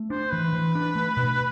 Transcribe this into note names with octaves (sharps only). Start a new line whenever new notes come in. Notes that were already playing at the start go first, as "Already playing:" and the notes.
Already playing: A3
D4 C5
E3 B4
E3
D4
A3
B2